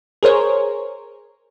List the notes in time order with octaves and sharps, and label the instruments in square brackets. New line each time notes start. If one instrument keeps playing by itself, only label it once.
[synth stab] G#4 A#4 C5 C#5